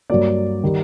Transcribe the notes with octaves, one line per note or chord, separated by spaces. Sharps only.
G2 F#3 A#3 D5
D#3 G3